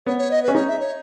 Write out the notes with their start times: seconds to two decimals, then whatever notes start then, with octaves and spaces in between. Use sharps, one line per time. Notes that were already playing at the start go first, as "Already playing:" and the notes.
0.06 B3 C#5
0.18 C#5
0.31 D#5
0.43 C#4 B4
0.55 D#4 C#5
0.68 E5
0.80 C#5